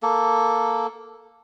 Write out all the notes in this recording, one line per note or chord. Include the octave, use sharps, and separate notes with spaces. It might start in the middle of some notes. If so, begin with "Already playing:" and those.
A#3 A4